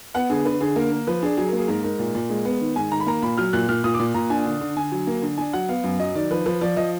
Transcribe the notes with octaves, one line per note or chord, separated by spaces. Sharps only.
B3 F#5
D3 G#4
D3 B4
D3 G#4
A#3 A#4
A#3
F3 B4
D4 G#4
F#3 G#4
A#4
A#3 G#4
G#2 A#4
G#2 A#4
A#2
A#2
G#3
B3
D#3
G#2 G#5
D#3 A#5
B5
A#3 A#5
A#2 B5
F#3 F6
A#2 F#6
A#2 F6
A#2 D#6
D6
A#2
A#2 A#5
D4 G#5
D3
D3
D3 G#5
F#3
A#3
D3
D4 G#5
F#3 F#5
B3 F5
F#2
F#3 D#5
D#3 D5
F3 B4
F3 B4
F3 D5
F3 D#5